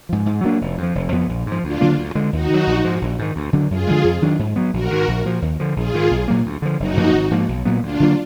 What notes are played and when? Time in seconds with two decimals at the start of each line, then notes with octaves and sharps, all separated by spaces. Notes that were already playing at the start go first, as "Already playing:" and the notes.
0.09 G#2 F3
0.26 G#2
0.44 F#3 A#3 D4
0.61 F1
0.78 F2
0.83 F3
0.95 F1
1.12 F2 F3 B3
1.29 A#1
1.46 G#2
1.52 F3
1.64 D2 D4 F4
1.81 D3 F#3 A#3
1.98 D2
2.15 D3 G#3
2.33 D#2 D#4 F#4
2.50 D#3 F#3
2.67 A#1
2.84 G#2 F3
3.01 A#1
3.19 G#2 D#3
3.36 D2
3.53 D3 F#3 D4
3.71 F#2 F4 G#4
3.87 D3 F3 G#3
4.04 F2
4.22 D#3 F#3 D4
4.39 G#2
4.56 F#3 B3
4.73 A#1 F#4 A#4
4.91 G#2 D#3
5.08 A#1
5.25 A#2 F3
5.42 D#2
5.60 D3 F3
5.76 A#1 F4 G#4
5.94 G#2 D#3
6.11 B1
6.28 A#2 F#3 A#3
6.46 D2
6.62 D3 F3
6.79 F#1 D#4 F#4
6.97 F#2 F3 A#3
7.14 G#1
7.31 G#2 F3 A#3
7.48 B1
7.65 A#2 F#3 B3
7.83 D2 D4 F4
8.00 D3 F#3 A#3